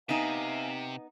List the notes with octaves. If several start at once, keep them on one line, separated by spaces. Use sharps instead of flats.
C3 B3 D#4 E5 F5 G#5